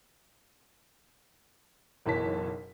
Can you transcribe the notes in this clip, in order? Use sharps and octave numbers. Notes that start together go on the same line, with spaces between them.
F#1 B1 E3 C#5 A5 B6